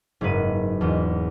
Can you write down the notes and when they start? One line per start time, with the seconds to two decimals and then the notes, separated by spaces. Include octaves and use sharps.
0.21 F#1 G#2 A#3 F#4 B4 D#7
0.81 E1 E2